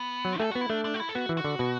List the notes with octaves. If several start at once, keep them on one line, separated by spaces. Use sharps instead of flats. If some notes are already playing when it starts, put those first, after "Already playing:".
Already playing: B3
F#3
A3 A4
B3 F#4
E4
A3 D4
D4
F#4
E4
A4
B3 F#4
E3
F#4
D3
B2